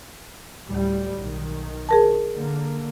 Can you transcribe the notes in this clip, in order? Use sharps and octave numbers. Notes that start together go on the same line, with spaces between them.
D2 A2 G3
B1 D#3
G#4 A#4 A5
D3 A#3